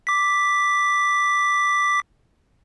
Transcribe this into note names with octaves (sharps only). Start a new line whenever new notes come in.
D6 B6